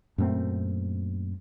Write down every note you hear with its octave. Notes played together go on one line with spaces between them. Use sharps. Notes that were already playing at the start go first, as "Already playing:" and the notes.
F#2 A#2 A3 C4